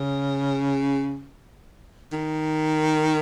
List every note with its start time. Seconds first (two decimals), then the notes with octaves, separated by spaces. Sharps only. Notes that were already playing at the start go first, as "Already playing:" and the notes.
Already playing: C#3
2.13 D#3